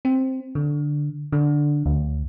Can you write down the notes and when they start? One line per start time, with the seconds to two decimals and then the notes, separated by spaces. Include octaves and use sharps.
0.05 C4
0.55 D3
1.32 D3
1.86 D2